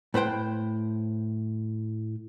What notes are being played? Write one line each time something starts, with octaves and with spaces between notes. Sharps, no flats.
A2 B4 C5 G5